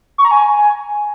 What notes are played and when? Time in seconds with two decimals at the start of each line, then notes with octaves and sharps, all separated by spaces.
0.18 C#6
0.25 A#5
0.31 G#5